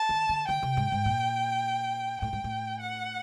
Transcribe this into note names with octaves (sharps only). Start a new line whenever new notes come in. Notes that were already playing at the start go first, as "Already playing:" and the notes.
Already playing: A5
D#3
D3
D3 G5
C3
G#2
G#2
A#2
A2 G5
G#2
A2
F#5